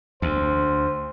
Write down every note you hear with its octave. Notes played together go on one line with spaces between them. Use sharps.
D2 C5